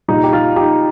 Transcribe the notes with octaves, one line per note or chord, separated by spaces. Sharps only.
A#2 G3 D#4
G4
F4
D#4 G4